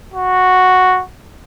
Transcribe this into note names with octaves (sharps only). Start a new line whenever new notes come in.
F#4